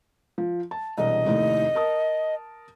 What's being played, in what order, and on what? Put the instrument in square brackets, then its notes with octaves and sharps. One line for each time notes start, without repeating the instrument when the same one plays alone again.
[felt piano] F3
A5
[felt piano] E1 C2 [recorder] D#5
[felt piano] F1 D#2 A2
A#4 A5 D#6